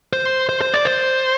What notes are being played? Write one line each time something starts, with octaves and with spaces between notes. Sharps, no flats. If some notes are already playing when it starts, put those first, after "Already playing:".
C5
C5
C5
D5
C5